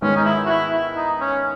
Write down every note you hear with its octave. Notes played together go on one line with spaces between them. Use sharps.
G#2 D#3 G#3 B3 C#4
D#4
E4
F#4
E4
E4
D#4
C#4